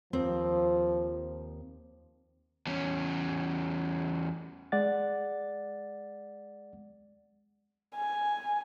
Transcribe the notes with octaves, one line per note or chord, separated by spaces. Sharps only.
D#2 F3 C4
E2 C#4
G#3 D5 F#5 A6
G#5